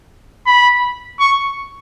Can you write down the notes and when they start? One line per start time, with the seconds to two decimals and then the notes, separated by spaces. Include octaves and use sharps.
0.46 B5
1.20 C#6